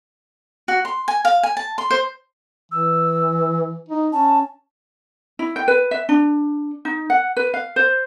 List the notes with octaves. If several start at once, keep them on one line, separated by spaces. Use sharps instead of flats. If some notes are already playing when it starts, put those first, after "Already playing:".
F#4
C6
G#5
F5
G#5
A5
C6
C5
E3 E6
D#4
C#4 A5
E4
G5
B4
E5
D4
D#4
F#5
B4
F5
C5